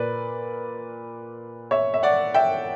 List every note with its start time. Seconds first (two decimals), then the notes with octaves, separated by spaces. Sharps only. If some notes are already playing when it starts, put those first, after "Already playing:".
Already playing: A#2 A#3 B4 D5
1.71 C#5 E5
1.94 E5
2.03 D5 F#5
2.34 E5 G5